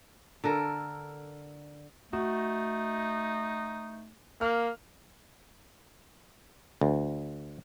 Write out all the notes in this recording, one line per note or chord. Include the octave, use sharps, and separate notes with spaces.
D3 A4 A#4
A3 D#4 F#4
A#3 F6
D2